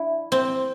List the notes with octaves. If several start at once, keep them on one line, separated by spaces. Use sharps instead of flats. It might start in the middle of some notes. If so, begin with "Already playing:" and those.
Already playing: D4 E4
C4